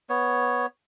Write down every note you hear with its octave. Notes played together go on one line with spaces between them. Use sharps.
B3 C#5